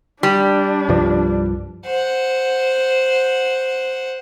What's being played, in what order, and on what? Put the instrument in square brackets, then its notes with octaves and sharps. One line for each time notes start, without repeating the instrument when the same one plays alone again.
[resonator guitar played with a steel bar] G3 [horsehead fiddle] D4
[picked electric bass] C2 G2 F3
[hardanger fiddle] C5 F#5